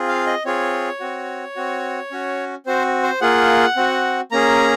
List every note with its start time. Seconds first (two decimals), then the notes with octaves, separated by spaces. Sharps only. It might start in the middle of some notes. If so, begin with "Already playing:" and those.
Already playing: C4 F4 G#4
0.08 F5
0.27 D#5
0.45 C4 F4 G#4 C#5
1.00 C4 F#4
1.56 C4 F#4
2.11 C#4 F#4
2.66 C4 F#4 C5
3.03 C5
3.21 A#3 F4 G#4 F#5
3.76 C4 F#4
4.31 A#3 C#4 G#4 A#5